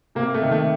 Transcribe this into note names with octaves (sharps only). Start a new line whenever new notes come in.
C3 A#3
A3
D#3
A3